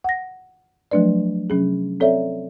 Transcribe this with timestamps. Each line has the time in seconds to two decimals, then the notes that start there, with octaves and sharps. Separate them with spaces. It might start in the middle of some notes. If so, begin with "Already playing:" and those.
0.04 F#5 A#6
0.91 F3 F#3 A3 D4 B4 D5
1.50 C3 F#3 C#4 G#4
2.00 C4 A4 C#5 D5 E5